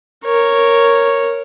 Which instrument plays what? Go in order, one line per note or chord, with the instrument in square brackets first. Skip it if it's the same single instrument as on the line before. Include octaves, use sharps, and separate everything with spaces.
[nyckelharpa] A#4 C#5